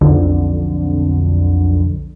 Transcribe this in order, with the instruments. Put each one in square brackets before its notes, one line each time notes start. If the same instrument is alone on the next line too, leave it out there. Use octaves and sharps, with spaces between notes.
[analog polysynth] B1 F2 D3